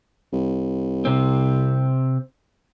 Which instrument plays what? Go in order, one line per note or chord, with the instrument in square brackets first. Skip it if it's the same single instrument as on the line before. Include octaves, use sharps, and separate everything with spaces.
[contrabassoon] C2
[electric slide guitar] C3 C4